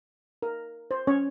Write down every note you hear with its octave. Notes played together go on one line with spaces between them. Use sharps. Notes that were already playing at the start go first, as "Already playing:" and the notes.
A#4
C5
C#4 C#5